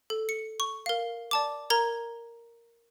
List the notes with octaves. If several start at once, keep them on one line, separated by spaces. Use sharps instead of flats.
A4
C#7
C#6
A#4 F5
D5 A5 D6
A#4 A#5 G#6